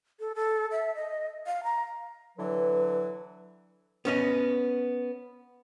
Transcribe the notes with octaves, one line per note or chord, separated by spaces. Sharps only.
A4
A4
E5
D#5
F5
A#5
D3 E3 F#3 B4
B3 C#4 D#5